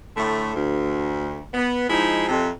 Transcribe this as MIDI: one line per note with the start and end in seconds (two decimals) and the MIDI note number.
0.17 0.53 45
0.17 0.53 50
0.17 0.53 57
0.55 1.40 38
1.54 1.87 59
1.90 2.27 53
1.90 2.27 56
1.90 2.27 63
1.90 2.27 64
2.29 2.49 41
2.29 2.49 48